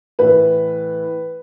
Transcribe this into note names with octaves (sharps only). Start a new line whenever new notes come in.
A2 E3 B4